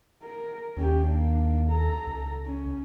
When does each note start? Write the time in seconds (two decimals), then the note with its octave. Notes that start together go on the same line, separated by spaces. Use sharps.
0.23 A#4
0.77 D#2 C#4 G4
1.07 A#3 D4
1.70 A4 A#5
2.07 C#2
2.47 C#4